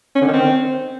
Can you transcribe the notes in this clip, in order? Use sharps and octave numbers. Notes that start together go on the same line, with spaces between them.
C#4
D3
D#3
C4